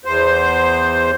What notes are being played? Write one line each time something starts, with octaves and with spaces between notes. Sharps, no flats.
E2 C5